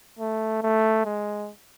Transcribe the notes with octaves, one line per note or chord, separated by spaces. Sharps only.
A3
A3
G#3